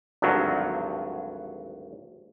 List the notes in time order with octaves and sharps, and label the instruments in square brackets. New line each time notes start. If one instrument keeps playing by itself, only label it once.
[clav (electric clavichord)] G#1 D2 G2 F3 F#3